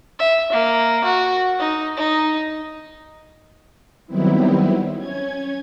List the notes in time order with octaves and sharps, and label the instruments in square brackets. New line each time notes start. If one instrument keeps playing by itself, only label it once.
[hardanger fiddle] E5
A#3
F#4
D#4
D#4
[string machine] D#3 F#3 G3 B3 C4 E4
C#4 G#6